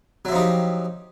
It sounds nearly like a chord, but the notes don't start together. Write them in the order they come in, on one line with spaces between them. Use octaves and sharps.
F#3 E4 F3 D#4 G4